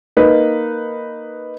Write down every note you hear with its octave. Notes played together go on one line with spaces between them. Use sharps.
A#3 D#4 B4